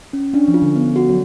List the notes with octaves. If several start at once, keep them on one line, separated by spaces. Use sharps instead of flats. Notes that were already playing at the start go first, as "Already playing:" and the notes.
C#4
C#4 D4
F3
F4
D3
B3
F#4
F#3